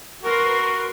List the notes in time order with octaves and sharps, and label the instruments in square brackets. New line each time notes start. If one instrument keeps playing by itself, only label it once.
[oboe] F#4 [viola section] A#4 B4 C6